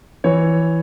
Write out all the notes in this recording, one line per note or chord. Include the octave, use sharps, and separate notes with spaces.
E3 C#5